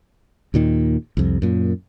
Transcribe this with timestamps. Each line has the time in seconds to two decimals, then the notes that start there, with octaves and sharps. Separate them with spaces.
0.54 D#2 A#2 D#3
1.17 C2 F2
1.42 F#2 A#2